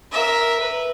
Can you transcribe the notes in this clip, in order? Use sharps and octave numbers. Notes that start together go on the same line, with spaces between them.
A#4 E5
B4